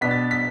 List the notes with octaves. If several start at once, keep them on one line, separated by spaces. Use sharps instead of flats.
B2 B3 D4 B6
A6
B6